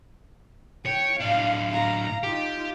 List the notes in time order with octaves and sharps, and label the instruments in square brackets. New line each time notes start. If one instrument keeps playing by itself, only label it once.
[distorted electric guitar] C#5 [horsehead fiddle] G5
[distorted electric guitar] A2 D4 [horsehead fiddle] F5
[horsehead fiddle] F5 A#5
[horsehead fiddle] D#4 F4 [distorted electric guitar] G4